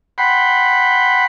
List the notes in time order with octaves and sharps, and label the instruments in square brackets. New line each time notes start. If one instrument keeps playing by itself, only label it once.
[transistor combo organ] F#5 G5 B5 C6